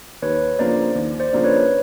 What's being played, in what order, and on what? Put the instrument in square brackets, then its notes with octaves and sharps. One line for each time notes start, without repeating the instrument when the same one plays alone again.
[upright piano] D#2 [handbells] B4 C#5
[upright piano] C#3 F3 A#3 D4 [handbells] C5 D5
[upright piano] D#2
[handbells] C5 D5
[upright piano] C#3 F3 A#3 D4
[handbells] B4 C#5